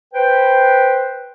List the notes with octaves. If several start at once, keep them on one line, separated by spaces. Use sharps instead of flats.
B4 C5 G5